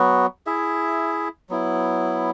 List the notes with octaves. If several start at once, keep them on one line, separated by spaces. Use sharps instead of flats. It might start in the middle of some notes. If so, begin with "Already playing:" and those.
Already playing: F#3 B3 F#4
E4 G#4 E5
F#3 B3 E4